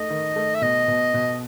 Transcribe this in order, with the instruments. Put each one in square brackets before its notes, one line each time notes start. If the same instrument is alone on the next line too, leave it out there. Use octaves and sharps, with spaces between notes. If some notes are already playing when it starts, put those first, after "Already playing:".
Already playing: [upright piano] A3 D#4 [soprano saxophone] D#5
[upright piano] D#3
A3
[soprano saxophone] E5
[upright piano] B2 [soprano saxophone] D#5
[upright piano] B2
B2